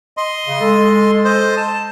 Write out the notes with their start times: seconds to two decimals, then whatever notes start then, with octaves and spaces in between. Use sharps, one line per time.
0.17 D#5 C6
0.47 C#3
0.60 G#3 A4
1.25 C5 D#5
1.57 A5